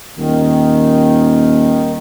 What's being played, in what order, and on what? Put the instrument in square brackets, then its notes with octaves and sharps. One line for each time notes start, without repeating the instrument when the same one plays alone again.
[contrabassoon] D#1 [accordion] D#3